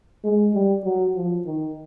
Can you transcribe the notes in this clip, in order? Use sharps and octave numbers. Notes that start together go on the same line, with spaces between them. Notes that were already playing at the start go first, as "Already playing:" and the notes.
G#3
G3
F#3
F3
D#3